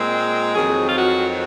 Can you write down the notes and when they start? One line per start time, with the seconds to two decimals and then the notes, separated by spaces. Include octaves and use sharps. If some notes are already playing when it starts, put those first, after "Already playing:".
Already playing: A#2 G#3 C4
0.54 F2 D#3 F#3 C4 G#4
0.88 F4
0.97 F#4